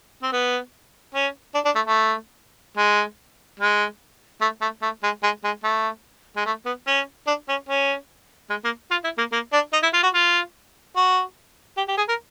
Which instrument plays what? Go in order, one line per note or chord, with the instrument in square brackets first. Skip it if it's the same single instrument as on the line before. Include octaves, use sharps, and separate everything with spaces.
[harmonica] C4
B3
C#4
D4
D4
A3
A3
G#3
G#3
A3
A3
A3
G#3
G#3
G#3
A3
G#3
A3
B3
C#4
D4
C#4
C#4
G#3
A#3
F4
E4
A#3
A#3
D4
D#4
E4
F4
F#4
F4
F#4
G4
G4
G#4
A#4